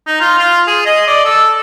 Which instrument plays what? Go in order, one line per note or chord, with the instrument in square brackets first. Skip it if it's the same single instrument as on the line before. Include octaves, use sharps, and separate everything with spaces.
[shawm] D#4
F4
F4
G#4
D#5
D5
A4